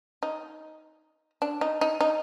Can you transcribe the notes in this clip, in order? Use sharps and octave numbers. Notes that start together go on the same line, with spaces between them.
D#4
D4
D#4
D#4
D#4